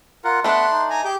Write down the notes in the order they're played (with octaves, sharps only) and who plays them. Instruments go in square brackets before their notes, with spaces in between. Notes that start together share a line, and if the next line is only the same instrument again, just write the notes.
[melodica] F4 A#4 F#5
[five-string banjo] A3 D4 [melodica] B3 F#5 B5 [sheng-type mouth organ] C6 F#6
[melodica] D#4
[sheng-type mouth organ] G#5 A#5
[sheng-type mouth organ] G4 D6 G6 [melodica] G#4